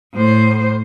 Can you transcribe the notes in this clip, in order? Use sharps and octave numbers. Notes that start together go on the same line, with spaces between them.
A2 C5